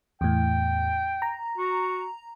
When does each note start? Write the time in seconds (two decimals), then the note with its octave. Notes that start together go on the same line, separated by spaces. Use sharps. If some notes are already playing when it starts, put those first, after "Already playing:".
0.21 E2 A2 G5
1.22 A#5
1.58 F#4